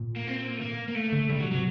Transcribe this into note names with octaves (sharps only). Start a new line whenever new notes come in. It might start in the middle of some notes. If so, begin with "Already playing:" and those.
Already playing: A#2
A#3
C4
A#3
A3
A#3
A#3
A3
D3
D3 G3
C3 F#3
A#2
C3 F#3